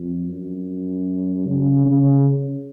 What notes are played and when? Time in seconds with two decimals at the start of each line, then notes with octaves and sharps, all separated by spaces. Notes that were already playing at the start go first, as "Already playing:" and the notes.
Already playing: F2
0.29 F#2
1.46 C#3
1.85 C#3